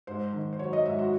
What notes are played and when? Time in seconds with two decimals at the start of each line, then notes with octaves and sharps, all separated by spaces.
0.07 G#2 C5
0.33 D#3
0.53 C5
0.59 F#3 C#5
0.73 D#5
0.85 G#2 E5
0.99 F#4